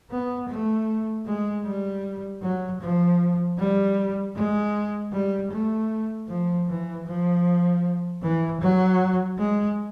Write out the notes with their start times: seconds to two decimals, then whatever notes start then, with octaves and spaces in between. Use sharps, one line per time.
0.11 B3
0.48 A3
1.26 G#3
1.65 G3
2.42 F#3
2.81 F3
3.58 G3
4.35 G#3
5.12 G3
5.51 A3
6.28 F3
6.68 E3
7.06 F3
8.22 E3
8.61 F#3
9.38 G#3